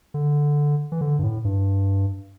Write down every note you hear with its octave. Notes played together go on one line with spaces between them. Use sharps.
D3
E3
D3
G2
A2
G2